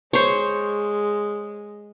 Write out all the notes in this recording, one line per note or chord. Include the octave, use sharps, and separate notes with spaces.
G#3 C5 C#5